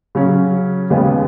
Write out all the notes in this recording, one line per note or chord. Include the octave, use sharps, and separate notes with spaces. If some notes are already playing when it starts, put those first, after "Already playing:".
C#3 F#3 C#4
D#2 C#3 G#3 B3